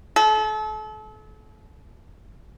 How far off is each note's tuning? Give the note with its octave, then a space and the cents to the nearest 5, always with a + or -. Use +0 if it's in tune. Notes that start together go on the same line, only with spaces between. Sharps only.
A4 -35